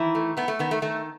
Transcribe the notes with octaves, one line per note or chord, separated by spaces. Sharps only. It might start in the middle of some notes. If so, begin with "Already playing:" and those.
Already playing: D#3 E3 E4
A3
A3 B3
A3
D#3 B3
A3
D#3 A3